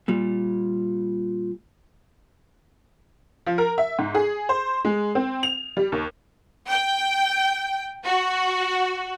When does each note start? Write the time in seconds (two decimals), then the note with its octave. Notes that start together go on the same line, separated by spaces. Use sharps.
0.08 A#2 G3
3.46 F3
3.58 A#4
3.78 E5
3.99 G#2
4.15 G#4
4.49 C5
4.85 G#3
5.15 C4
5.43 F7
5.77 G3
5.92 D#2
6.69 G5
8.04 F#4